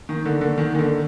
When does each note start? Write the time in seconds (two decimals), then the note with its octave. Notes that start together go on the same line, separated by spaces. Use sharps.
0.09 D#3
0.25 D3
0.41 D3
0.58 D#3
0.74 D#3
0.79 D3